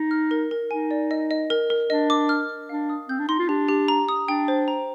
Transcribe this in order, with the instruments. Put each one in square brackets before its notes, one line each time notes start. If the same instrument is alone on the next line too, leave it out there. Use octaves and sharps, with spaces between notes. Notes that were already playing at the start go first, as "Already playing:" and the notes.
Already playing: [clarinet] D#4
[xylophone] F6
A#4
A#4
[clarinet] D#4 [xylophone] G#5
[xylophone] D5
D#5
D#5
A#4
A#4
[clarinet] D4 [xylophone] D#5
[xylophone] D6
F6
F6
[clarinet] D4 [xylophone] F5
[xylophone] D#6
[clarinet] C4 [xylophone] G6
[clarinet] D4
[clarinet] D#4 [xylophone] C6
[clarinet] F4
[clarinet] D4 [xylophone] G4
[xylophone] G4
A#5
D#6
[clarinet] D4 [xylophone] G5
[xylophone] C5
A#5